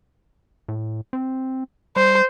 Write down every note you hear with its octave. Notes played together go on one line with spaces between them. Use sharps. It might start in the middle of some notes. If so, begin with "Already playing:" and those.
A2
C4
G3 C5